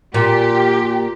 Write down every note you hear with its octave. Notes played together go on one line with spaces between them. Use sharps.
A#2 G4